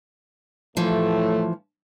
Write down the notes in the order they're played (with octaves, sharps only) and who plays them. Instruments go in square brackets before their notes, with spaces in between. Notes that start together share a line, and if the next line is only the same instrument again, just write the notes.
[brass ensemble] A2 A3 [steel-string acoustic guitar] E3 F3